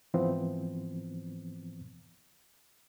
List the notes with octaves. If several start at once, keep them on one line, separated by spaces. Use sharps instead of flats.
G#2 E3 F3 B3 C4